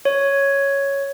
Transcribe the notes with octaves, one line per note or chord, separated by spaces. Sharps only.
C#5